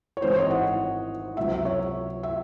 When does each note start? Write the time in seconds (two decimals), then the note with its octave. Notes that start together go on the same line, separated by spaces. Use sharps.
0.17 C#5
0.22 G#1 G#2 E3 C4 C5
0.31 C#5
0.41 D#5
0.51 F#5
1.37 C#2 C3 F#3 E5
1.52 E5
1.65 C#5
2.23 E5